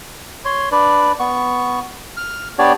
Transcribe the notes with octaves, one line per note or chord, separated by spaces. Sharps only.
C#5 C6
D4 B4 D5
B3 C#6
F6
B3 D4 G4 C#5 D5